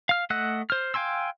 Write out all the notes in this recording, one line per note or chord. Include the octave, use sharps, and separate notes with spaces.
F5 F6
A3 D#5 F#5 E6 F#6
C5 F6
F5 G5 G#5 C6 E6